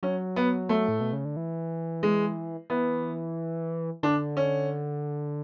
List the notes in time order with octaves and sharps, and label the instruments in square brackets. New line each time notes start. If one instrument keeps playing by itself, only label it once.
[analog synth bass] F#3 [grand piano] C#4
[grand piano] B3
A3
[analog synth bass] A2
B2
C#3
D3
E3
[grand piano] G#3
[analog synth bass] E3 [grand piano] B3
[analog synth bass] D3 [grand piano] D4
[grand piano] C#4